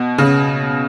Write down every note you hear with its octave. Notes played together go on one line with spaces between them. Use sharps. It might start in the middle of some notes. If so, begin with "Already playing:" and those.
Already playing: B2
C#3